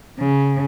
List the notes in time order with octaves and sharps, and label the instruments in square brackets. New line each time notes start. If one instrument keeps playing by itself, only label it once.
[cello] C#3